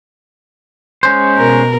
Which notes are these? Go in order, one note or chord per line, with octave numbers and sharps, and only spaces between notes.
G#3 C#4 C5
B2 A#4